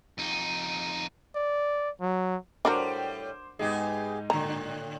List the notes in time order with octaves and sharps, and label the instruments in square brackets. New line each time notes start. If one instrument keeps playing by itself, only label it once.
[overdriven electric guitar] F2 D#4
[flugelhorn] D5
F#3
[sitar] A2 G3 [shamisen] D4 F#4 A#4 [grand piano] C5 D6
[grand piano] G#2 D#4 [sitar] B3 G4 G#4
[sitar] A2 D3 [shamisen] A#5